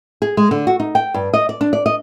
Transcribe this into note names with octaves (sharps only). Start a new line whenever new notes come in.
G#4
G#3
D3
F#4
D#4
G5
G2
D#5
D5
D4
D5
D#5